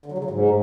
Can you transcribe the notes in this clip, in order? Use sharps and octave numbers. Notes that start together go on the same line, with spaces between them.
D3
F#3
C#3
F#3
G#2